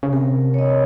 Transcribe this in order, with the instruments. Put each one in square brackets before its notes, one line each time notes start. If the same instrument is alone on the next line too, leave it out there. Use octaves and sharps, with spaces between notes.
[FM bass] C#3
[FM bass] C3 [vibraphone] A#4
[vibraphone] C#5
D#5